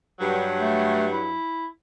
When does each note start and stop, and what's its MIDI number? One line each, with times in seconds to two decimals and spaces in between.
0.20 1.35 43
0.20 1.35 54
0.60 1.06 57
1.13 1.68 64